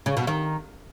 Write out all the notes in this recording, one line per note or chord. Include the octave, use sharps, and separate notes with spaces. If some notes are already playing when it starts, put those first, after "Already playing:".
C#3
B2
D#3